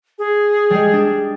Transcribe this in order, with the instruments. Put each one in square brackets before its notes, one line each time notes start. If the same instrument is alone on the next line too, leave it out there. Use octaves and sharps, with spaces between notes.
[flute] G#4
[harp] G3 G#3
D4